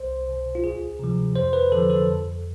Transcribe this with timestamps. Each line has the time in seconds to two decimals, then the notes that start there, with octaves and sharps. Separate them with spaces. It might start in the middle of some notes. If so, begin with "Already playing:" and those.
Already playing: C2 C5
0.29 B2
0.55 F4
0.64 D2 G#4
0.99 C3 F3
1.35 F2 C5
1.53 B4
1.72 D3 F3 A4
1.90 A4
2.08 F2